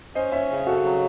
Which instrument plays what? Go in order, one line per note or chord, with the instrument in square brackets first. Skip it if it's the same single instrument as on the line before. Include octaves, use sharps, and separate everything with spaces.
[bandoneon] C#4 [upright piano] C5 D#5
[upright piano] C#5 E5
[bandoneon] C#3
[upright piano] F#4 A4
[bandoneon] F#3